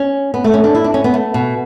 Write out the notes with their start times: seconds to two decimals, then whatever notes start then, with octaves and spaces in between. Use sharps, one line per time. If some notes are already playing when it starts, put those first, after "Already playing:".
Already playing: C#4
0.34 B3
0.44 A3
0.54 C#4
0.64 D4
0.75 E4
0.84 D4
0.94 C#4
1.04 B3
1.14 A3
1.34 B2